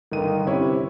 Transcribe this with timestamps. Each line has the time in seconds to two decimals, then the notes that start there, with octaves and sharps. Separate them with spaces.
0.12 G1 D3 D#3 D#7
0.47 C3 C#4 E4 C#5